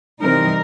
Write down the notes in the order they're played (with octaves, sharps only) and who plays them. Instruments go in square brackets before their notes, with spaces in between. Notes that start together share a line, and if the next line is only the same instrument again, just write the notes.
[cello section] C3 E3 G3 C4 D#4 A#4